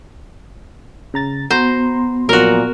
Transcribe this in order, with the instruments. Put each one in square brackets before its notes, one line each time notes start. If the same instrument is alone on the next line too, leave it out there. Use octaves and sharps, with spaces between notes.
[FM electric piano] C#3 A#5 A6
[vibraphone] B3 [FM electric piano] F#4 A#5 C6 [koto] C5
[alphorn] A#2 [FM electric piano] F3 F#3 [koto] F#4 A#4